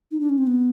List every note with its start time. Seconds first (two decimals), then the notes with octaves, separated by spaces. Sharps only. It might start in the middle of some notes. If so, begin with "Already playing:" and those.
0.11 D#4
0.20 D4
0.29 C#4
0.38 C4
0.47 B3